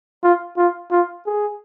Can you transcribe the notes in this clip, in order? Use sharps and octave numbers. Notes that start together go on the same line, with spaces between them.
F4
F4
F4
G#4